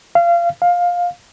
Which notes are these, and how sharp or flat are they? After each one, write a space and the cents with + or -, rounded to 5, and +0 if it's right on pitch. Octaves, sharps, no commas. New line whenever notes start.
F5 -25
F5 +15